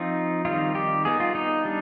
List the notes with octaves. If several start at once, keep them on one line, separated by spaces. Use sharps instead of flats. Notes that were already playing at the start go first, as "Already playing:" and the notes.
Already playing: F3 C4 D#4 F4
D#3 G3 C4 D#4 F4
G4
G3 B3 D#4 G#4
F4
D#4
G3 D4